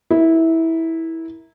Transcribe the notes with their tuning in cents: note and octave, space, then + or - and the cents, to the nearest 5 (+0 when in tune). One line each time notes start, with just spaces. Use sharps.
E4 -15 A#4 +0